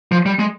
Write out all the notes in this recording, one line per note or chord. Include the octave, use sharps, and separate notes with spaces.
F3
G3
G#3